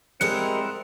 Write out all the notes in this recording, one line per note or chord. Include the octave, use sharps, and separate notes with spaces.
G3 G#3 C4 E4 A#4 D#5 F#5